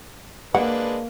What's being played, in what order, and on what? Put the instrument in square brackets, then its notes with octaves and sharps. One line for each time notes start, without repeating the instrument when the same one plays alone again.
[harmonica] G#3 D4 B4 [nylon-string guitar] A#3 [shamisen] F#5